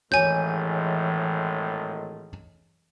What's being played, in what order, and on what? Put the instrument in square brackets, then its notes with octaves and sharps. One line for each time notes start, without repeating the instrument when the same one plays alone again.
[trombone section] G#1 A2 G#3 [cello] E3 [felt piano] C#5 [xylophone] G#5 G6